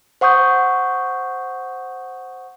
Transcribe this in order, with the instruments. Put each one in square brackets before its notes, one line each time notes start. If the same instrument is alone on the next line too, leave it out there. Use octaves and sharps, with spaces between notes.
[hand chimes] C5 F#5 C#6 D#6 G6